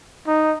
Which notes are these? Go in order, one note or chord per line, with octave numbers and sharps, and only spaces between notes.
D#4